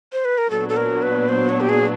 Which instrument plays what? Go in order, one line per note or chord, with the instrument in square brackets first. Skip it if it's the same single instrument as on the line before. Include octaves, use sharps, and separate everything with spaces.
[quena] C5
B4
A#4
[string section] A#2 F#3 B3 D4 [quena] A4
[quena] A4
A#4
B4
C5
C#5
G4
G#4